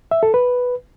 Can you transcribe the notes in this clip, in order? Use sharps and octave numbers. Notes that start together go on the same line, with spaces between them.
E5
A4
B4